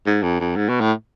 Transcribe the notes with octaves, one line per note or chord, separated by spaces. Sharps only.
G#2
F2
F2
G#2
B2
A2